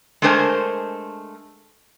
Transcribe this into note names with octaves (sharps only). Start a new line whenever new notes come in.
G#3 A3 D4 A#4 C5 G#5